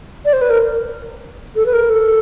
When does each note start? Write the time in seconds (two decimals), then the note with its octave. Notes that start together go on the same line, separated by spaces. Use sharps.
0.25 D5
0.33 C5
0.41 B4
0.50 A#4
1.56 A4
1.66 B4
1.73 A#4
1.89 A4